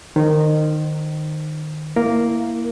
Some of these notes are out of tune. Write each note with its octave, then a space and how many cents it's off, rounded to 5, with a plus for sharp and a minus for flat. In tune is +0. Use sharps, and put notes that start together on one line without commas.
D#3 -20 C5 +0
A#3 +0 E4 +0 A#4 +0